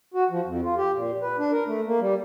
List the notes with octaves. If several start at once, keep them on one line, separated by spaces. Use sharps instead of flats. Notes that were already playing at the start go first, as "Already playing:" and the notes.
F#4
F3
F2
F4
G4
A#2
B4
D4
A#4
A3
A#3
G3